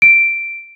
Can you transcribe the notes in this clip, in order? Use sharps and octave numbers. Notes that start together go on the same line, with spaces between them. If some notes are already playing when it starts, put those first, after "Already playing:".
D7